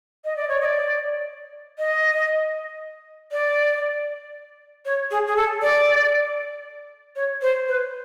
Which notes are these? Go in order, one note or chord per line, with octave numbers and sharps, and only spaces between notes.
D#5
D5
C#5
D#5
D5
D#5
D5
C#5
G#4
G#4
A4
D5
C#5
C5
B4